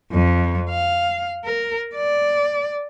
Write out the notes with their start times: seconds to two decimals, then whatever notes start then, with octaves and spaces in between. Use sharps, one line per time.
0.12 F2
0.69 F5
1.44 A#4
1.94 D5